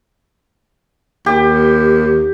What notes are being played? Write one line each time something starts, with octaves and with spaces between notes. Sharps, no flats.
D#2 G4